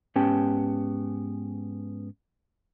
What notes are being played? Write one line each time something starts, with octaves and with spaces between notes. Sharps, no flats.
G#2 B3 C#4 G4 G5 A5